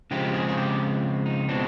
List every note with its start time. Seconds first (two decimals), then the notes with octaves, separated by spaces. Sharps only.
0.11 C#3 F3 G#3 C4 G4
0.34 G#4
0.48 G#4
0.57 G4
1.26 D#4
1.49 B2 G#3 C4 D4